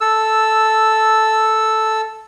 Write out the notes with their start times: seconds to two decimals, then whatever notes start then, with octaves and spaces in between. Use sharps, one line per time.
0.01 A4 E6